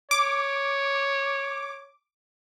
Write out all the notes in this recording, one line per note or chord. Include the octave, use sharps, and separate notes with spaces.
C#5 D6